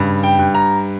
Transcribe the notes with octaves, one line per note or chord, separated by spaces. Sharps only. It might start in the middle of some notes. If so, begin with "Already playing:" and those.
Already playing: G2 C#3
G5
G2
A#5